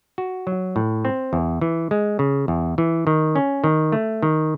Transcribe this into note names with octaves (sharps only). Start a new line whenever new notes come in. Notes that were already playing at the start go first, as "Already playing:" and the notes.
F#4
F#3
A2
C4
E2
E3
G#3
C#3
E2
E3
D#3
C#4
D#3
A3
D#3